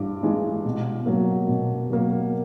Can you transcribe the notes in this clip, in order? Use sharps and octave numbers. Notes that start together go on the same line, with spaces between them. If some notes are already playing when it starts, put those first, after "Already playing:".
Already playing: G2 E3 D6
E3 G#3
B2
F#3 A#3
B2
F#3 A#3